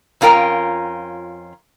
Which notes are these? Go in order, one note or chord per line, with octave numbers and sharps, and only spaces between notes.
F2 C#4 F4 A#4 G5 A#5